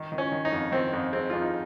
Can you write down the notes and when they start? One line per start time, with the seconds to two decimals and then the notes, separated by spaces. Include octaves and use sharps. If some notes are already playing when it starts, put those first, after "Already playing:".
Already playing: D#3
0.12 D#3
0.18 C#4
0.32 D#3
0.45 D#4
0.52 F2
0.72 D#3 C4
0.93 F2
1.12 G#3 C4
1.30 F2 F4
1.42 D#4